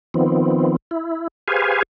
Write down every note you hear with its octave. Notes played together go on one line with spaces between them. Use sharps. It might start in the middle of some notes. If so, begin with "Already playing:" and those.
D#3 F3 B3 C4
E4
G4 G#4 B4 C5 F5 G#5